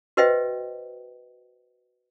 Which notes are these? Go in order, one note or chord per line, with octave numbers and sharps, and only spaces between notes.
F#4 B4 C5 D#5 E5 G5